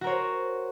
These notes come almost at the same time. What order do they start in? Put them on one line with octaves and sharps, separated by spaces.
F#4 A#4 C#5 C5